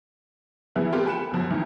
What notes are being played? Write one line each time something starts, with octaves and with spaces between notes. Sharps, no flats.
E3 F3 B3 E4 G#4 B4
A3 B3 C4 F4 G4 A#4
G5 G#5 B5 F#6 C#7 E7
B5
F#2 B2 F3 F#3
F2 G#2 D#3 E3